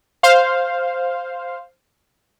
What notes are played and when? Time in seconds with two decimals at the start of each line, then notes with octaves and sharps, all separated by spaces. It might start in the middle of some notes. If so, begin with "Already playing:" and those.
0.23 C5 F5